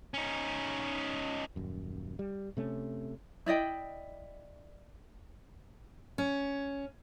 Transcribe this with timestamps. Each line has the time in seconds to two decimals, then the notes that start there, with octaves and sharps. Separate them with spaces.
0.14 C#4 D#4
1.56 D#1 F#2
2.19 G3
2.57 C3 A3 C#4
3.46 E4 D5 D#5 G5
6.18 C#4